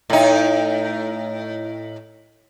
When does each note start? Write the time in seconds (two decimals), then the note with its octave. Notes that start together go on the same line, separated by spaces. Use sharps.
0.10 A2 D#4